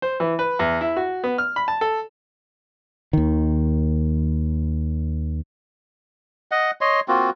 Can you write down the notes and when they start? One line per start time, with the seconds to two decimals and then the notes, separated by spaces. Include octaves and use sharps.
0.02 C5
0.20 E3
0.39 B4
0.59 E2
0.81 E4
0.97 F#4
1.24 B3
1.38 F6
1.56 B5
1.68 A5
1.81 A4
3.13 D#2 D#3
6.51 D#5 F#5
6.81 C#5 D#5 C6
7.08 A#3 C4 F4 F#4